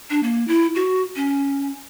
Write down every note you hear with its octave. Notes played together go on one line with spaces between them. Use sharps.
D4
A#3
E4
F#4
C#4